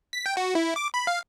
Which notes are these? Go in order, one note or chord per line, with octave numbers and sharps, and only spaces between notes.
B6
G5
F#4
E4
D6
B5
F5